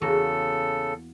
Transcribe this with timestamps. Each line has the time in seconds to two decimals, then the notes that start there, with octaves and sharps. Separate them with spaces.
0.01 E2 C#3 A#3 F#4 A4